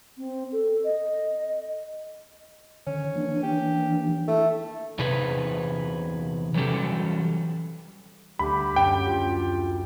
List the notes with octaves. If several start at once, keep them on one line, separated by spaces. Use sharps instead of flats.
C4
A4
D#5
D3 D#3 C#4
E3 A#3 D4
G4
A3 E4 A4
E2 C3 D#4 G#4 B4
E3 F#3 G3 C#4 G4 A4
D2 G3 G4 B5
F#2 D4 G5
F4